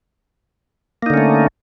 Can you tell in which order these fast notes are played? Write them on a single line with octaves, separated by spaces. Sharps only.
A#3 D#4 D3 C#4 A3